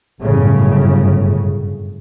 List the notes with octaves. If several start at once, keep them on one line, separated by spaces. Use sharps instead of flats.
G1 F#2 A2 C#3